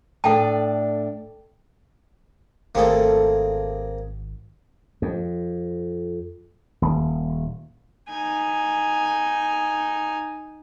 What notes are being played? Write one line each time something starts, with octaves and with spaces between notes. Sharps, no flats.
A2 D4 A4 D5 G5 A5
G#1 A3 A#3 C4 G#4 A4
F2
D#1
D#4 G#5